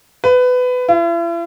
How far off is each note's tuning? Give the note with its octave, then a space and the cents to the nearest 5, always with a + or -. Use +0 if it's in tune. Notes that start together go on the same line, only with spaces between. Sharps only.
B4 +20
E4 +45